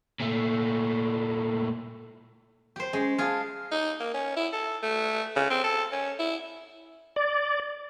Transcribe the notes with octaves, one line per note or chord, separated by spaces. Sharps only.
A#2 A3
G4 C5
G#3 C#4 G#4
F4 G#4 F5 A5
D#4
A#3
C#4
E4
A4
A3
C#3
C4
A4
C#4
E4
D5